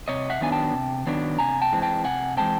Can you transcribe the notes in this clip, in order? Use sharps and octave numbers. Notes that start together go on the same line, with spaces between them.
C3 C#5 D#5
E5 F#5
D#3 F#3 B3 D4 G#5
G5 A5
C3
D#3 F#3 B3 D4
C3 G#5 A#5
G5 A5
E3 G#3 C4
G5 A5
C3 F#5 G#5
E3 G#3 C4 G5 A5